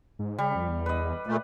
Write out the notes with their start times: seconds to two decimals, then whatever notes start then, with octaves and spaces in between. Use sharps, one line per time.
0.19 G#2
0.38 C#3 G3
0.55 F2
0.69 E2
0.86 B4 D#5
1.27 A#2 A3